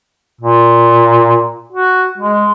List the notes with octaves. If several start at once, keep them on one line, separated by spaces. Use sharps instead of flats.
A#2
F#4
G#3